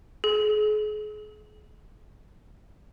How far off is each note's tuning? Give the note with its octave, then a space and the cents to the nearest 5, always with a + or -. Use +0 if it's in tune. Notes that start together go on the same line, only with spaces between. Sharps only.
G#4 +35